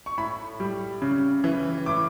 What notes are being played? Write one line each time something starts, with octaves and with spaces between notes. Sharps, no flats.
C#6
A2 B5
G3
C#3
E3
A2 D6